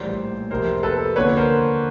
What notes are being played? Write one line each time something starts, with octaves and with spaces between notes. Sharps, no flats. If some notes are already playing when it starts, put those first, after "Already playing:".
Already playing: A#1 A2 E3 G3 A#3 C5 D5
F2 C3 F3 A#4 C5
A4 B4
D#2 D3 F3 B4 C#5
A#4 C5